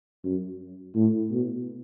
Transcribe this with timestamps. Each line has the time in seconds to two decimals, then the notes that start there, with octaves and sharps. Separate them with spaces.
0.25 F#2
0.96 A2
1.31 B2